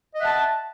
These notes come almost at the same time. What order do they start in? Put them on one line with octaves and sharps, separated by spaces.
D#5 E5 F#5 A5